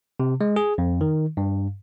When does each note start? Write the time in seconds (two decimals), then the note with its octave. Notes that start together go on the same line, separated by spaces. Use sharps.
0.20 C3
0.41 G#3
0.56 G#4
0.78 F2
1.01 D#3
1.37 G2